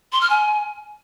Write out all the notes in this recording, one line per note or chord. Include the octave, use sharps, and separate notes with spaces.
C6
F6
G#5